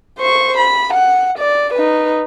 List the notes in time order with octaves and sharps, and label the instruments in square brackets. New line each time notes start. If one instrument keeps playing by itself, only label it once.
[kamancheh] C5 C#6
B5
F#5
D5
D#4 B4